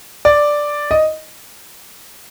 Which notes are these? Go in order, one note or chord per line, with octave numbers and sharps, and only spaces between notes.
D5
D#5